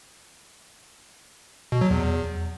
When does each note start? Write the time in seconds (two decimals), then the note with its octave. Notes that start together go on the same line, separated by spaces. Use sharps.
1.72 B2
1.81 F#3
1.91 E2